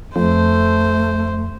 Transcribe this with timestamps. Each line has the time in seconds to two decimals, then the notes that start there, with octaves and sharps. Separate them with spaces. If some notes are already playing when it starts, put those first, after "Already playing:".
0.16 F2 A3 C5